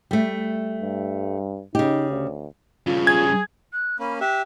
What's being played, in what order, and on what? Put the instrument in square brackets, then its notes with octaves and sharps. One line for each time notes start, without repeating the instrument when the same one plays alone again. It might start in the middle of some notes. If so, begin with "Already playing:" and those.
[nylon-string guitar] G3 A3
[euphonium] G2
[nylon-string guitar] C#3 G4 [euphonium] D#4
[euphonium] D2
[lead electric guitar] G2 C#3 [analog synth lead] F4
[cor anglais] G#4 [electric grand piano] G#6
[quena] F#6
[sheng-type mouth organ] A#3 C#4 [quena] B5
[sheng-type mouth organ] G4 E5 [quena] F#6